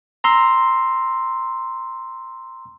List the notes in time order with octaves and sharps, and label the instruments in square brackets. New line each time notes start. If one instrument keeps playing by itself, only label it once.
[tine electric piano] A#5 C6 E6